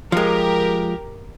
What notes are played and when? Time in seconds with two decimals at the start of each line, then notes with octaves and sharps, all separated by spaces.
0.12 F3 G#3 G4 A#4